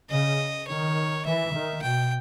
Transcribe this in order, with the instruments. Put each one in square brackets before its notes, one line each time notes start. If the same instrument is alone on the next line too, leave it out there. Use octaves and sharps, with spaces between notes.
[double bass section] C#3 [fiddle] D#5
[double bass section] D#3 [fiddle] C#5
[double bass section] E3 [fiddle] E5
[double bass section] D#3
[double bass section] B2 [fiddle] G5